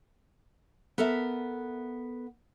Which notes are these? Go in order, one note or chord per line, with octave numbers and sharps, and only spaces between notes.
B3 A4 A#4 E5